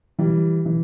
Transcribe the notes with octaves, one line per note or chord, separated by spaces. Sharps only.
E3 G3
E3